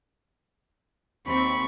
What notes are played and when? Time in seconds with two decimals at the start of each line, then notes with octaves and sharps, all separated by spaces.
1.27 D#2 C4 B5 C#6